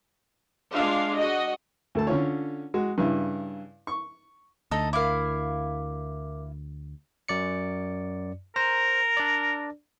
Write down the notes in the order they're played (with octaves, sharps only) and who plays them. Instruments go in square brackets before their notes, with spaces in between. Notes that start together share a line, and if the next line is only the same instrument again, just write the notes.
[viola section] G#3 D4 F4 F5
F#4 D#5
[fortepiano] D2 A4 A5
D3 C#4 F4 C#5
G#3 F#4
G2 C#3 E4
C#6
[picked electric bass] D2 [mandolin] D#4 A4
[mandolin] E4 F5 [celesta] A#4 D6
[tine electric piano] F#2 D5 C#7
[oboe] A#4 [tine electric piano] C5 A#5 A#6
[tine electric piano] D4 D5